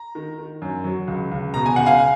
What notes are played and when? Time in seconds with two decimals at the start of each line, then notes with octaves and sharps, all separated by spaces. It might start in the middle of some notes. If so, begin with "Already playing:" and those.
Already playing: A#5
0.15 D#3
0.38 D#3
0.62 F#2
0.84 F#3
1.07 C#2
1.31 C#2
1.54 B2 A#5
1.66 G#5
1.76 C#2 F#5
1.86 F5 G#5